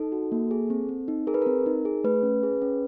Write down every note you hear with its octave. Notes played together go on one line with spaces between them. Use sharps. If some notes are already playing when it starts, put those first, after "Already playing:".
Already playing: D#4 A4
F#4
A#3
G#4
C4
C4
D#4
G#4 A#4
B4
C4 A#4
D#4
G#4
A3 B4
C#4
G#4
C#4